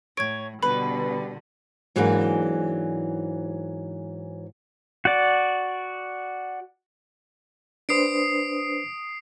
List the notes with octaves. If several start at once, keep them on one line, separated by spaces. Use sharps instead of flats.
A2 C#5 G#6 D7
B2 D3 G3 B3 B4 B5
G#2 E3 F#3 G#3 A#3 D4
F#4 D5
D4 B4 C5 D#6 C7 D7